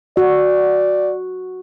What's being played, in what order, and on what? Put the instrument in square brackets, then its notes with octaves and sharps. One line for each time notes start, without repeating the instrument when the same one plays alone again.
[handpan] F#4 [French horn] D5